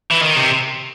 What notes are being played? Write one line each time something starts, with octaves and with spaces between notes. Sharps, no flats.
E3
D#3
C3